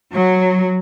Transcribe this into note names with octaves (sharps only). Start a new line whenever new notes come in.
F#3